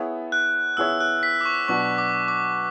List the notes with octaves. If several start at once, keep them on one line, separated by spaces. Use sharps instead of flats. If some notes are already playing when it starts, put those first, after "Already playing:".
Already playing: B3 E4 G#4 C#5 E5
F#6
B3 E4 G#4 C#5 E5 E6
F#6
B6
D6
C#6
B2 F#3 B3 D4 F#4 C#6
D6
D6